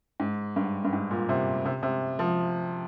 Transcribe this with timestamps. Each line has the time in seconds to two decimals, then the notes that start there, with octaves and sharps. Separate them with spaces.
0.20 G#2
0.56 G2
0.85 G2
0.93 G#2
1.11 A#2
1.29 C3
1.65 C3
1.83 C3
2.19 F3